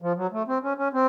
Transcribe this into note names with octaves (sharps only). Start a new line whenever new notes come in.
F3
F#3
A3
C4
C#4
C#4
C4